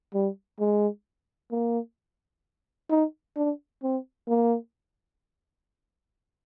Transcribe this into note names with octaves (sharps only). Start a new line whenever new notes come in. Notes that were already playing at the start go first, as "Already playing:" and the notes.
G3
G#3
A#3
D#4
D4
C4
A#3